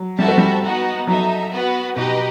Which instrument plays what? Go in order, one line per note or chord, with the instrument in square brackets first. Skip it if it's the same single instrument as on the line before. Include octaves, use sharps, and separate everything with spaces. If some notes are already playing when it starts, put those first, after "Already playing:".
Already playing: [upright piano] F#3
[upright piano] G3 [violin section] C4 F#4 A4 E5 A5
[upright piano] A3
G3
[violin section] B3 D#4 F#4
[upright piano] F#3 [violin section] D#4 A4 E5
[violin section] B3 F#4 B4
[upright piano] B2 [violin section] D#4 G4 B4 D#5